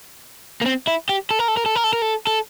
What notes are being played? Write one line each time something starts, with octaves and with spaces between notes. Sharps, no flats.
A#3
C4
E4
G4
A4
A#4
A4
A#4
A4
A#4
A4
A#4
A4
A4